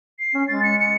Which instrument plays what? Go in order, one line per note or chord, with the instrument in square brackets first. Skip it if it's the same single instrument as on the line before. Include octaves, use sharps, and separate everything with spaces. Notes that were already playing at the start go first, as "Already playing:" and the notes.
[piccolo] C7
[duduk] C#4
[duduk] G#3 [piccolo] A6
[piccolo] C#7
C#7